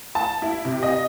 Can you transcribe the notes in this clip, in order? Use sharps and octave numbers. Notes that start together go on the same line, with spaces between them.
A5
E4
C3
D#5